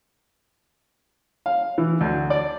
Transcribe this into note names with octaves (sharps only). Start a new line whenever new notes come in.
F5
E3
D2
D5